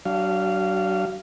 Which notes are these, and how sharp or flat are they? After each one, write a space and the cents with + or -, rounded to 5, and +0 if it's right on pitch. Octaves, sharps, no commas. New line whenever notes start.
F#3 +35 D4 +0 F5 -15